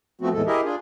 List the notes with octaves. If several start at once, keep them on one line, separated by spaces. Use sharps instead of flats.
F3 A3 B3 C4 F#4
E2 A2 E3 G#3 A4
E4 G4 G#4 A#4 D#5 E5
D4 F4 G#4